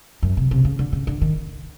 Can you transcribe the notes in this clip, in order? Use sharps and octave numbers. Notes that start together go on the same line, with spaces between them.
F#2
C3
C3
C#3
D3
C#3
D3
D#3